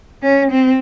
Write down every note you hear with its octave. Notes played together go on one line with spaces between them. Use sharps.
C#4
C4